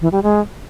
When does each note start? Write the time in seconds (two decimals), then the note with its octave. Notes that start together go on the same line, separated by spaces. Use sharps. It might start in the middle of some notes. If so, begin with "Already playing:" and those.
0.01 E3
0.12 G3
0.23 G#3